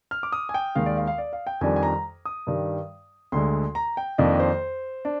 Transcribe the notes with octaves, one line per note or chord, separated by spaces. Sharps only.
F6
D6
D#6
G#5
G5
D#2 D#3 G#3 F5
D5
F5
F5
D5
F5
G5
F2 D#3 G3 D4 G#5
G#5
A#5
D#6
G2 D#3 G3
D2 D3 G#3 C6
A#5
G5
F2 D#3 A#3 D4 D#5
C5
D4